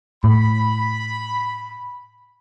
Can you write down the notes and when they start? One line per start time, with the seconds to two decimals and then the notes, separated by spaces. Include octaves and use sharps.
0.24 A2 B5